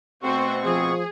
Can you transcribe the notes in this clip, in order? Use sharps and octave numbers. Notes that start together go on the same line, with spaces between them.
B2 A3 C4 F#4 C5 C#6
F3 G#4